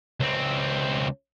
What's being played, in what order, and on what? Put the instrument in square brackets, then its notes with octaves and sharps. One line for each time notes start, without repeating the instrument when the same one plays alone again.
[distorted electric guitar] C#2 C4